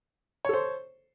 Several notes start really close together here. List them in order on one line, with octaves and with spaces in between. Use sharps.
C#5 A4 C5